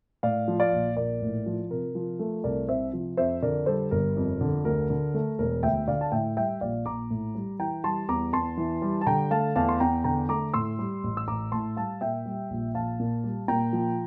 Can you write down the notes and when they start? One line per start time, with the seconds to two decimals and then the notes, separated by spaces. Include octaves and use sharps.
0.23 A2 D5 F5
0.48 F3
0.60 D5 F5
0.72 A#1
0.97 A#1 A#4 D5
1.22 A2
1.46 F3
1.71 C3 A#4
1.95 F3
2.19 A3
2.44 C2 A#4 D5
2.69 C3 C5 E5
2.93 F3
3.17 F2 C5 E5
3.42 D3 A#4 D5
3.66 G3 A4 C5
3.91 G1 A#4
4.17 F2
4.41 D3
4.65 D2 A#4
4.90 D3
5.14 A3
5.39 E1 A#4
5.63 D2 E5 G5
5.88 D3 D5 F5
6.01 A5
6.12 A2 E5 G5
6.37 G3 E5 G5
6.61 A#1 D5 F5
6.86 A#1 A#5 D6
7.11 A2
7.35 G3
7.59 E3 G5 A#5
7.84 G3 A5 C6
8.09 E2 A#5 D6
8.33 E2 A5 C6
8.57 E3
8.82 G3
9.01 A5
9.06 D3 G5 A#5
9.31 A3 F5 A5
9.56 E2 F5 A5
9.69 C6
9.80 E2 G5 A#5
10.04 D3 G5 A#5
10.29 A3 A#5 D6
10.54 A2 C6 E6
10.79 G3
11.04 A1
11.17 E6
11.27 A1 A#5 D6
11.52 A2 A5 C6
11.76 G3 F5 A5
12.01 A#2 E5 G5
12.26 G3
12.50 A#1
12.75 A#1 F5 A5
13.00 A#2
13.24 G3
13.48 A#2 G5 A#5
13.73 F3